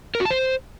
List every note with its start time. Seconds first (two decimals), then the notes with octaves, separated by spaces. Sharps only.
0.15 A#4
0.20 F#4
0.25 A5
0.31 C5